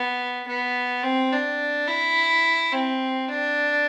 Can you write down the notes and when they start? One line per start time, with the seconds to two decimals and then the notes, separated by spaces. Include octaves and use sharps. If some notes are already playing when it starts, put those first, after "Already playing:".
Already playing: B3
0.47 B3
1.03 C4
1.32 D4
1.87 E4
2.72 C4
3.28 D4